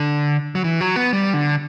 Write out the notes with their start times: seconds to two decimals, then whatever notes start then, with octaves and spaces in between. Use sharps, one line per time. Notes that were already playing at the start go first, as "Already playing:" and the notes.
Already playing: D3
0.55 F#3
0.64 E3
0.81 F#3
0.96 B3
1.13 G3
1.34 D3